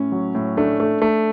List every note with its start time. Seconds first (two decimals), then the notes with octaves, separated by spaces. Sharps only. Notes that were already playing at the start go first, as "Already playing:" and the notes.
Already playing: A2 C#4
0.12 F#3
0.35 A2
0.57 A3 D4
0.80 A3
1.02 A3